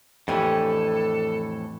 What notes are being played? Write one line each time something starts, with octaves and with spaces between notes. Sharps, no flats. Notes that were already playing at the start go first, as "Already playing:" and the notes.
F2 A2 E3 D4 G4 A4 G#5